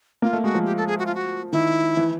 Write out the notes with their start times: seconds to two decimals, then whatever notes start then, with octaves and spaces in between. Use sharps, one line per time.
0.22 A#3 F4
0.33 A3
0.43 G#3 F#4
0.55 F3
0.65 G4
0.77 A4
0.87 G#4
0.99 F#4
1.06 F4
1.15 F#4
1.52 D#3 E4
1.97 E3